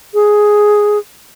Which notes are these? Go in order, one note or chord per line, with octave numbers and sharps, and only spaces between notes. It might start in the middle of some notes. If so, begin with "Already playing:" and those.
G#4